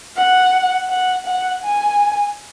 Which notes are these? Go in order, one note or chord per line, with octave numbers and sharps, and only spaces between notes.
F#5
F#5
F#5
G#5